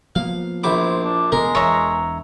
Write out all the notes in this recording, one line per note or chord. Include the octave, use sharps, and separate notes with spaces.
F3 A#3 B3 F5
A#1 E4 C5 D6
D4
E1 B2 G#3 A3 A#4
E1 E3 C#5 E5 A#5